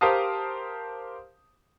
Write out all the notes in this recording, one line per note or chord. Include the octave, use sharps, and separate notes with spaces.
G4 A#4 C5 F5 A5 D#6